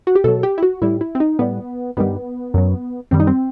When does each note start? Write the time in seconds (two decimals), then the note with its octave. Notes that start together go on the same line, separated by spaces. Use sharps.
0.07 F#4
0.15 G4
0.24 B2 F#3 A4
0.43 G4
0.58 E4
0.63 F#4
0.82 A2 G3 E4
1.01 E4
1.15 C4
1.20 D#4
1.39 A2 G3 B3
1.97 G2 D#3 G3 B3
2.54 F#2 F#3
3.11 F#2 D#3 G3 C4
3.20 D#4
3.27 C4